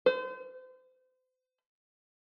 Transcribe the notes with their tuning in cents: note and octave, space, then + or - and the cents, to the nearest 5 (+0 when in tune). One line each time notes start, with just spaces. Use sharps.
C5 -35